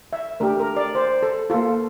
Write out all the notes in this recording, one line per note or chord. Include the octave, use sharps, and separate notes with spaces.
E5
A3 D4 G4 A#4
A#4
D5
C5
A4
A#3 F4 A4